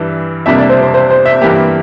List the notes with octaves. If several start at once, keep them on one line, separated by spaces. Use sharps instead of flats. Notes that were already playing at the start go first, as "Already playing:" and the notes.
Already playing: G2 E3 G3 E5
F2 C3 G3 A#3 D4 E5
D5
C5
C5
C5
C5
E5
G2 E3 A#3 G4